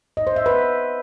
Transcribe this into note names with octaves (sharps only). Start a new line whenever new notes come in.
D#5
C5
E5
B4